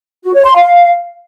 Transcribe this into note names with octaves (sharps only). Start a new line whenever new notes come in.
F#4
C#5
C6
F5